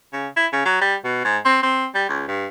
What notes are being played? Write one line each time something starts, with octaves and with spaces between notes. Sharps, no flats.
C#3
E4
C#3
F#3
G3
B2
G#2
C4
C4
G3
C#2
G2